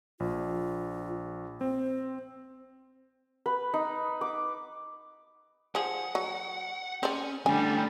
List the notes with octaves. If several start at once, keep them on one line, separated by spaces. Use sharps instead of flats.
A#1 F4
C4 C5
B4
D#4
D6
F3 G#4 F#5
F#3
C4 C#4 D5
D3 G3 A3 C#4 G#5